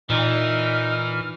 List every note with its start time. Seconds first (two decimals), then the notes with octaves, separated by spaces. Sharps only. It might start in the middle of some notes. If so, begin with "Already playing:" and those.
0.10 A#2 E3 D#4 F6